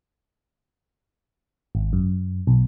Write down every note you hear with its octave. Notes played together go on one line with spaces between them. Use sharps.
G#1
F#2
B1